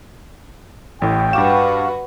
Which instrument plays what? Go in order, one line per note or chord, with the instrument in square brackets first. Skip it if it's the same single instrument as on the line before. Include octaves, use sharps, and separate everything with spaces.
[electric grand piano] A1 A2 [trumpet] G5
[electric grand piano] G2 D6 E7 [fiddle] F#4 B4 [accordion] F5 F#5 C#6